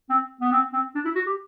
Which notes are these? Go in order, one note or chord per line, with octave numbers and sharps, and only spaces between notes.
C4
B3
C4
C4
D4
E4
F#4
G4